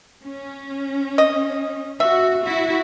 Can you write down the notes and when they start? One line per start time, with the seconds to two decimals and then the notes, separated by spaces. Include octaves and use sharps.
0.24 C#4
1.18 D#5
2.00 F#4 E5
2.44 E4 F#4